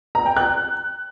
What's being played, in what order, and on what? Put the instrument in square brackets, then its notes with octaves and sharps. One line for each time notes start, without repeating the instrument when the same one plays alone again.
[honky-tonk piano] A#5
G5
F#6